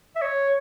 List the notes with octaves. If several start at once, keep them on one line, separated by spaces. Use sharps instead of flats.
E5
C#5